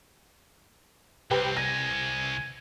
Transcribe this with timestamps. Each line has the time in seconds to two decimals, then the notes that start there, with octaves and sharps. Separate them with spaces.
1.31 C2 C4 G4 B4 G5
1.57 G#5 A#6